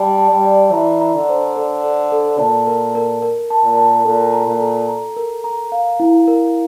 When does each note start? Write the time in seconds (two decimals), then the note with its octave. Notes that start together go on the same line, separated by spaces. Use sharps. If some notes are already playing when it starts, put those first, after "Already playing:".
Already playing: G3 A5
0.18 A5
0.31 G3
0.45 D5
0.73 E3 A#5
1.01 A#5
1.15 D3
1.29 C5
1.56 A4
1.84 A4
2.12 A4
2.39 A#2 A5
2.67 A#4
2.95 A#4
3.22 A#4
3.50 A5
3.64 A#2
3.77 A5
4.05 A#2 A4
4.33 A#5
4.47 A#2
4.60 A4
4.88 A#5
5.17 A#4
5.44 A#5
5.72 F5
6.00 E4
6.28 A#4